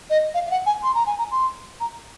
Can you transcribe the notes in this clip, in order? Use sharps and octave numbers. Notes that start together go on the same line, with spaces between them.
D#5
F5
F5
F#5
G#5
C6
A#5
G#5
A#5
C6
A#5